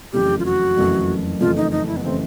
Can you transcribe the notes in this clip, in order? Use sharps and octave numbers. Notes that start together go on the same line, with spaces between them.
F#1 F2 C#3 E3 A3 G4
F4
F#4
F#1 F2 C#3 E3 A3
F#1 F2 C#3 E3 A3 F4
D#4
D#4
E4
B3
C#3 E3 A3 C4